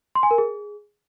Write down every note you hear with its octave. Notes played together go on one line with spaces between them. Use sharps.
C6
G#5
A#4
G#4